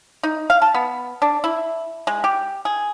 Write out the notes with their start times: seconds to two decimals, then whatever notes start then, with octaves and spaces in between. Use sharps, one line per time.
0.23 D#4
0.50 F5
0.62 A5
0.75 B3
1.22 D4
1.44 E4
2.07 G#3
2.24 G4
2.65 G#4